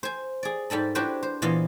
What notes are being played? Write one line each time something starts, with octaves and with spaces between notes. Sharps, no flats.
C5 G#5
G#4 D5
G#2 G3 A4 B5
D4 E4 F#4 G4 B4 C5
C5
A#2 E3 B3 F4 D#5 F5